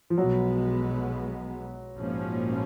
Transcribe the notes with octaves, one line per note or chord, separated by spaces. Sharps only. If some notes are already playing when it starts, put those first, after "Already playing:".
F3
B1 B2 F#3 G#3 B3
A#1 G#2 F3 A#3 C#4